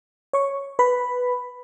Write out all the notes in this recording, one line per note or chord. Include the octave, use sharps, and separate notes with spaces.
C#5 C#6
B4 B5